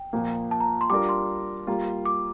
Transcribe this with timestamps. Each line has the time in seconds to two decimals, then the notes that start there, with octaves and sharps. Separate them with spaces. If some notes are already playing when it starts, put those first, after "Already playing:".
Already playing: G5
0.13 A#2 F3 A#3
0.51 A5
0.60 A#5
0.81 C6
0.90 G3 D4 F4 A#4 D6
1.09 C6
1.67 G3 A#3 F4
2.06 D6